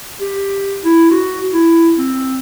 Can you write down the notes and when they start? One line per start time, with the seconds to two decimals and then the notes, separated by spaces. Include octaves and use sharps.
0.21 G4
0.85 E4
1.11 F#4
1.53 E4
1.98 C4